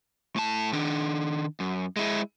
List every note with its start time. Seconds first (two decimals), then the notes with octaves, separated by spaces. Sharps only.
0.36 A2 A5
0.73 D#3 D4
1.60 F#2
1.96 G#3 E4